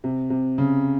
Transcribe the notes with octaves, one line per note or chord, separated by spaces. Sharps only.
C3
C3
C#3